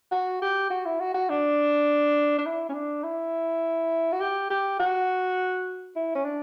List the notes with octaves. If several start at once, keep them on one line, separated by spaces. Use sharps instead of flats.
F#4
G4
F#4
E4
F#4
F#4
D4
D4
E4
C#4
D4
E4
F#4
G4
G4
F#4
E4
C#4
D4